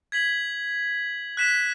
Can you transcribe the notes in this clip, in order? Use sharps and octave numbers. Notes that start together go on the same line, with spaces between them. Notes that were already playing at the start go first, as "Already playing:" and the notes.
G#6 B6 F#7
F#6 B6 E7